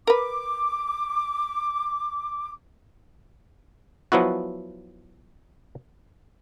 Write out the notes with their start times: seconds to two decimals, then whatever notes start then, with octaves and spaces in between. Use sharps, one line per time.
0.07 A#4 B4 D6
4.12 F3 F#3 B3 E4 F#4